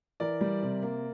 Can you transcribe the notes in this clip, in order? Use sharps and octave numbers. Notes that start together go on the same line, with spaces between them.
E3 A#4 D5
G3
C3
A#3